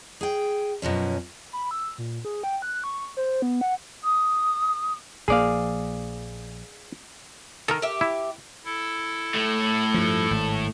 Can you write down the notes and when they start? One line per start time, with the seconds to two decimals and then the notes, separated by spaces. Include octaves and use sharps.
0.21 G#4 G5
0.82 F#2 B2 F3 C#4
1.53 B5
1.71 E6
1.98 A#2
2.25 G#4
2.43 G5
2.62 F#6
2.84 C#6
3.17 C5
3.42 B3
3.61 F#5
4.03 D#6
5.28 A#1 F3 A#3 G#4 D5 F5
7.68 D#3 A4 A#4
7.82 G4 E5
8.01 E4
8.65 E4 A4
9.34 A2 A3
9.94 G2 F3
10.31 G#1